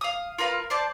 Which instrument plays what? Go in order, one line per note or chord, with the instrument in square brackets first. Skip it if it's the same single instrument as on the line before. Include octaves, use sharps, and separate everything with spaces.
[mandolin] F5 D#6
F4 A#4 B4 F5
C5 D5 A5